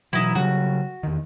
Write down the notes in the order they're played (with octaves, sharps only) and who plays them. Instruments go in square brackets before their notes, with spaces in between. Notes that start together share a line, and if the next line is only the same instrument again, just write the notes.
[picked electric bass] B2 E3 F#3 [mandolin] D#4 E4
[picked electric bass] C#3 F#3 G3 [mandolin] F#4
[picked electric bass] E2 D#3